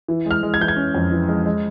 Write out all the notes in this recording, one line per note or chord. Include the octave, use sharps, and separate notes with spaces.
E3
G#3 F6
G#3
G#6
E3 G6
G#6
C#4
F2
E3
G#3
G#3